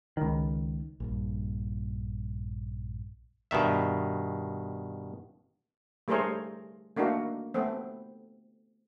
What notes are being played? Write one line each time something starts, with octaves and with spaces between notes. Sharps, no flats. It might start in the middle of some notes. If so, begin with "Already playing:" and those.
C#2 D#3
A#1 G2
G2 B2 D#3 E5
G3 A3 G#4 A#4 C5 C#5
A3 A#3 D4 D#4 F#4
A3 B3 C4